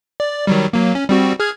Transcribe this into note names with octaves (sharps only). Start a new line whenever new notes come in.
D5
D#3 F#3 G3
F#3 A#3
C#4
G3 C4 F#4
G#4 F6 G#6